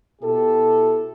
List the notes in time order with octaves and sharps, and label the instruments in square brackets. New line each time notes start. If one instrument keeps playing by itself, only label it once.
[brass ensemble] B2 E4 G4 A4